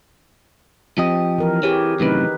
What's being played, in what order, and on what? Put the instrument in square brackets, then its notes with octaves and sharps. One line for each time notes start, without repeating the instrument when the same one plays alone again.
[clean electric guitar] F3 G4 D#5 [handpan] C4
[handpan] E3 A#4
[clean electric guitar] E3 [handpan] G4 G#4 C#5
[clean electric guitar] F#2 A2 C3 [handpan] D#3 D#4 B4